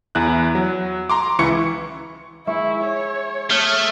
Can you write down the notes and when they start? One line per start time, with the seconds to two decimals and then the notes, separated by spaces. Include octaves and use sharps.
0.15 E2 E4 F#6
0.55 F#3
1.10 A#5 C6 D6
1.39 C#2 E3 E4 C#6 C#7
2.47 G#3 E4 E5 C#6
2.84 C#5
3.50 A3 D#6 F6